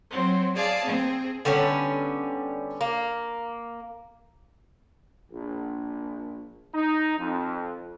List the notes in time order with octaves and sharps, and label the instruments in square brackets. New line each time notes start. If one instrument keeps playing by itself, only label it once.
[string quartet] F#3 C4
G#4 D5 F5 A5
C4 G#4
[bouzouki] D3 G3 B3 C#4
A#3
[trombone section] A#1
D#4
F2